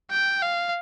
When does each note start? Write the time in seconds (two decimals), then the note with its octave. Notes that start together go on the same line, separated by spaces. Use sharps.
0.11 G5
0.42 F5